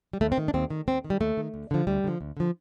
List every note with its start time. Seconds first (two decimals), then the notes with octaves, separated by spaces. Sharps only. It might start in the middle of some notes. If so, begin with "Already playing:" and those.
0.13 G3
0.21 D#2 A3
0.32 C4
0.38 D#3
0.48 D4
0.54 D#2 C4
0.70 D#3
0.88 D#2 C4
1.04 D#3
1.10 G3
1.20 D#2 A3
1.37 D#3
1.54 D2
1.71 D3 F3
1.87 D2 G3
2.04 D3 F3
2.21 D2
2.37 D3 F3